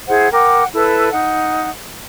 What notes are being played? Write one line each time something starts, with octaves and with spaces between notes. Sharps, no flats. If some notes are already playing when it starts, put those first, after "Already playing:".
E4 G#4 C5 F#5
A#4 F#5 G5 D6
E4 A4 B4 E6
D#4 F#5